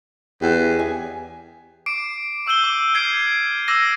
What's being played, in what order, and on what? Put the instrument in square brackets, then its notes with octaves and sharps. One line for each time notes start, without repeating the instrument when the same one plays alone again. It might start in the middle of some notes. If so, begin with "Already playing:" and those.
[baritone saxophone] E2 [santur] G4 G#4
[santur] G#5
[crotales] D6 C7 D7
D6 E6 G6 D#7 G7
D6
E6 F6 G#6 C7 D7
D6 E6 A#6 D#7